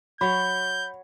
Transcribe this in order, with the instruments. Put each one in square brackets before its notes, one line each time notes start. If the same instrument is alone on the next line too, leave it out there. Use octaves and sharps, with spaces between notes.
[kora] F#3 C#5 [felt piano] B5 [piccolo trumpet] G6